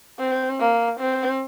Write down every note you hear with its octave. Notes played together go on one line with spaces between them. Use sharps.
C4
A#3
C4